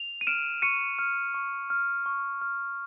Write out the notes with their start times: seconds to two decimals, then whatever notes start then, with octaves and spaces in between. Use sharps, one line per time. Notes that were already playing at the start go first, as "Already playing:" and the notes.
Already playing: F7
0.21 D#7
0.27 F6 D7 E7
0.62 C#6 C#7 D#7
0.99 F6
1.34 C#6
1.70 F6
2.06 C#6
2.42 F6